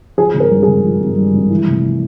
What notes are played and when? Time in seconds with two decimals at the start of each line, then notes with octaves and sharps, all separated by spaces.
0.18 F3 G#4
0.34 G#1
0.40 A#4
0.51 G2
0.63 G#4
0.68 G#1
0.84 F3
1.01 G#1
1.18 G2
1.34 G#1
1.50 E3
1.67 F1